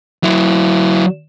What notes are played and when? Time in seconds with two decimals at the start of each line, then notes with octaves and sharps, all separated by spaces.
0.23 F#3 E4